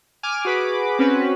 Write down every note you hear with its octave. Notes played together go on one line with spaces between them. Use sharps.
G#5 D6 F6
F#4 G#4 B4 B5 D6
C4 C#4 F#4 B4